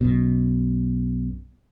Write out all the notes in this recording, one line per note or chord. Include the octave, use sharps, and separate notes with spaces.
B1 F#2 B2